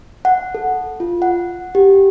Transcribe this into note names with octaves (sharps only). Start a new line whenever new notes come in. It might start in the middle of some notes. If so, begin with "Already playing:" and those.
F#5
A4
F4
F#5
G4